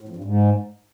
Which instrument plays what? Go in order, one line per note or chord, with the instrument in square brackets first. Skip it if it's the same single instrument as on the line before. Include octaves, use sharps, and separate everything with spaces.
[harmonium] A2
F2
G2
G#2